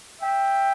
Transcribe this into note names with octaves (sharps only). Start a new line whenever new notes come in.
E5 G5